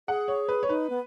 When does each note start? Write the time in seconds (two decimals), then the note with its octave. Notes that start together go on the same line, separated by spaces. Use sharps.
0.08 G#4 F#5
0.28 C#5
0.48 B4
0.63 C#5
0.69 D#4 B4
0.90 B3